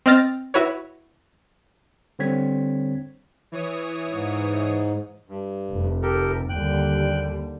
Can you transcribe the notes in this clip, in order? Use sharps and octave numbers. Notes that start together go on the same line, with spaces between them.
C4 D#5 F6 A6 A#6
E4 F#4 B4 C#5
D3 G3 C4 C#5 G#6 B6
E3 C#5 D#6
G#2
G2
F1
G4 A4 A#4
D#2 D3 G3 G5 F#6